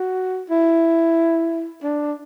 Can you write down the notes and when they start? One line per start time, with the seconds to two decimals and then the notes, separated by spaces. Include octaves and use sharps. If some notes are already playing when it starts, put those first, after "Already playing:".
Already playing: F#4
0.50 E4
1.83 D4